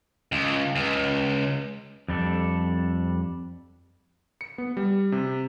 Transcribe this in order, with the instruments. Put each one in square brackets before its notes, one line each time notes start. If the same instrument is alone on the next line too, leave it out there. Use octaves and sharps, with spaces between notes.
[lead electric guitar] C#2
C#2
[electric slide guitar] F2 G3 D4 A4
[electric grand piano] C#7
B3
G3
C3